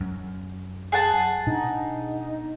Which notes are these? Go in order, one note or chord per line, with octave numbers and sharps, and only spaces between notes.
F#2
G#4 F#5 A5
B2 D4 D#4